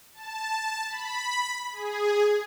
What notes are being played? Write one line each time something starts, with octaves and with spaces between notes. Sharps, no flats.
A5
B5
G#4